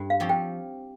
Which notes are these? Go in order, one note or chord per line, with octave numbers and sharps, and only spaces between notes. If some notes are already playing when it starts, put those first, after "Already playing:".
Already playing: G2
F5
F3 C4 G4 C#5
G5